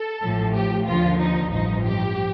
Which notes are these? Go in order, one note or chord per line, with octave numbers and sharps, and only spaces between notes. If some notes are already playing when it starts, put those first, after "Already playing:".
Already playing: A4
A1 A2 F3
G4
D#2 D3 F3 F4
D#4
A1 G2 F3 D#4
G4